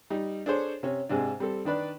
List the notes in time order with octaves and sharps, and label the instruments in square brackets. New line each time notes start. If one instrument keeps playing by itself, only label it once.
[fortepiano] G3 D#4
D4 G#4 A4 C5 C#5
C3 C#4
G#2 C3 G#3 D4
G3 C4 A4
D#3 D4 B4 D5